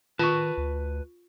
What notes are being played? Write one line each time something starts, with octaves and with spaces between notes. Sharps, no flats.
D#3 F4 B4 A5 C#6
D2